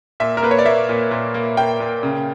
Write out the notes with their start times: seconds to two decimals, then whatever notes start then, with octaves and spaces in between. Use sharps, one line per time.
0.20 A#2 E5
0.37 A#4
0.43 A#3 B4
0.51 C#5
0.59 D5
0.66 A#3 E5
0.89 A#2
1.11 A#2
1.34 A#3
1.57 A#3 G5
1.80 A#2
2.03 C#3